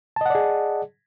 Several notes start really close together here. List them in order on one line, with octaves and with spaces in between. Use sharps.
A5 D#5 F#5 D5 G#4